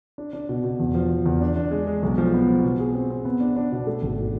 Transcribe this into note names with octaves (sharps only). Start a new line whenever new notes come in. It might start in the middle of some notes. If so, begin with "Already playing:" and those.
D4
D4
B2
B2
E2
F3
F3
E2
D4
D4
G#3
G#3
B1
F3
B3
F3
B2
G#4
C4
C4
B3
D4
D4
B2
A3
G#1